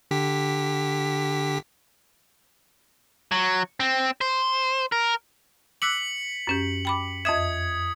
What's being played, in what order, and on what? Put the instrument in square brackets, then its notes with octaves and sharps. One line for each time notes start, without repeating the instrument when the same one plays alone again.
[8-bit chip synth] D3 G4 B6
[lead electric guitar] F#3
C4
C5
A#4
[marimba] D6 E6 F#6 [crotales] B6 C#7 F#7
[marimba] F#2 C#4 G4
G5 B5 D6
[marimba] F2 D#5 E5 [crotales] D#6 G#6